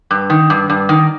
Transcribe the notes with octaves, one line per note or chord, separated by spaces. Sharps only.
G2
D#3
G2
G2
D#3